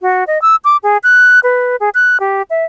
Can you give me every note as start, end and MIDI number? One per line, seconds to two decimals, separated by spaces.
0.02 0.24 66
0.27 0.41 75
0.42 0.56 88
0.64 0.77 86
0.83 0.97 68
1.03 1.40 90
1.43 1.76 71
1.80 1.89 68
1.94 2.18 90
2.20 2.42 67
2.50 2.65 76